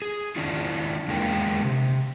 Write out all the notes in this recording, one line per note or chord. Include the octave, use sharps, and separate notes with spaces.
G#4
D#3 C#4 D4 E4 F4
E2 D3 G#3 A#3 G5
C3